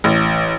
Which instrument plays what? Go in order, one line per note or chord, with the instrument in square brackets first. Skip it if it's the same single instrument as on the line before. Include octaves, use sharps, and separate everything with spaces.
[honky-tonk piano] A1